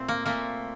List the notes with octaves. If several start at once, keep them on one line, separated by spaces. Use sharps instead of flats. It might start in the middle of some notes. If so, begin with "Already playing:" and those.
Already playing: A#2 A3 C4
A#3
A#2 A3 A#3